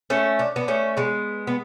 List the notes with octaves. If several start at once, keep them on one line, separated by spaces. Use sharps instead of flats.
A3 C#4
D4
B3 D4
A3 C#4
G#3 B3
B3